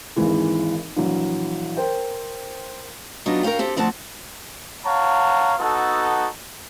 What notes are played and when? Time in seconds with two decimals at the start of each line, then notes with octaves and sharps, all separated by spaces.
0.16 G#1 D#2 E3 G#3
0.96 A#1 E3 F#3
1.77 A#4 C5 G5
3.26 F#3 B3 D4 D#4 F4
3.43 A#4 B4 C#5 F5 G5
3.59 C4 G4 A4
3.77 D2 F3 C4 F#5 A5
4.86 C#5 F5 F#5 A5 A#5
5.59 B3 D#4 F#4 A4